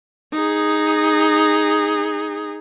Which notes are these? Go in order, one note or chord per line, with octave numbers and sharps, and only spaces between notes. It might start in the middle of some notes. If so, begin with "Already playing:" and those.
D#4 G#4